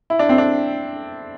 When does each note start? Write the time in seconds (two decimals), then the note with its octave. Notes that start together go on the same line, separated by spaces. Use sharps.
0.10 E4
0.19 D4
0.29 C4
0.38 D4